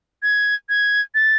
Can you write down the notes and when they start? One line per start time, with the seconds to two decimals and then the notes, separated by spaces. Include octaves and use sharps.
0.23 G#6
0.69 G#6
1.15 A6